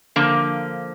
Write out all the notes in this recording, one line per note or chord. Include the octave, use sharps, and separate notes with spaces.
D3 F3 A#3